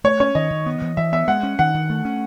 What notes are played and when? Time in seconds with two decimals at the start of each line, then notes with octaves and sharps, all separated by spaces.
0.04 A3 C#5
0.20 C#4 C#5
0.35 D#3 D#5
0.51 D#3
0.66 B3
0.82 E3
0.97 E3 E5
1.12 B3 E5
1.28 G#3 F#5
1.43 C#4
1.59 D#3 F#5
1.74 D#3
1.90 A3
2.05 C#4